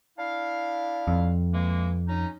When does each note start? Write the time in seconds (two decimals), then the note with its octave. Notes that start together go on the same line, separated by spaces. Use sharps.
0.18 D4 E4 F5
1.08 F2
1.54 E3 G#3 A#3
2.08 C#4 D#4